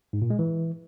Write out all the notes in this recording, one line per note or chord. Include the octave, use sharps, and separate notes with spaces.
G#2
A#2
G#3
E3